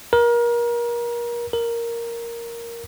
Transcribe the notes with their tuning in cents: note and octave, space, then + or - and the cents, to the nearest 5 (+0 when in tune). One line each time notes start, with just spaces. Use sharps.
A#4 +30
A#4 +0